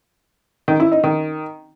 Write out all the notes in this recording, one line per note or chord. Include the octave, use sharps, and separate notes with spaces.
D#3
E4
D#4
D#3